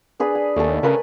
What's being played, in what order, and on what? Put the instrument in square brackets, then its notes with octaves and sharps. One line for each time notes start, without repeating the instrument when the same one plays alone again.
[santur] D4 G#4 B4
G#5
[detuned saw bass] D#2 [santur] A3 A4
[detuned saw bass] C#3 [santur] A#4 B4 G#5